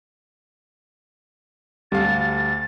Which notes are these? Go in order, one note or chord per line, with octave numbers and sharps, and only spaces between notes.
D2 G3 A4 F5 A6